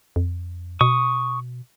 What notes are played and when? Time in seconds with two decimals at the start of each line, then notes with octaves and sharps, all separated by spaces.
0.16 F2
0.81 B2 C#6 D#6